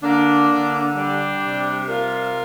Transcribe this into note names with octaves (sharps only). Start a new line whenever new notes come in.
D3 A#3 D4
D3
G3 D4 G4
C3
G3 F4 A#4